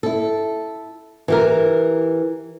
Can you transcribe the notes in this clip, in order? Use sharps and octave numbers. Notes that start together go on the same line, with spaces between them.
E4 A4
E3 G4 A#4